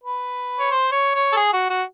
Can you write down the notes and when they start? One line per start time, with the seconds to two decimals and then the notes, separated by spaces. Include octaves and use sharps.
0.04 B4
0.60 C#5
0.71 C5
0.92 C#5
1.15 C#5
1.32 A4
1.36 G#4
1.53 F#4
1.70 F#4